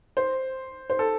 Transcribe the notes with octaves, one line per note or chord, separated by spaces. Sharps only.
C5
C5
A4